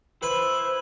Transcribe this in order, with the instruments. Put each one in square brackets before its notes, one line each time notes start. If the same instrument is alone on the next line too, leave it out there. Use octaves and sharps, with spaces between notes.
[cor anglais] E4 [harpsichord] B4 [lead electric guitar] C5